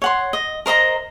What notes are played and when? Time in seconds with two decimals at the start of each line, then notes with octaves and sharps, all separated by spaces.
0.02 C#5 F#5 C6
0.33 D#5
0.66 A#4 C5 D#5 A#5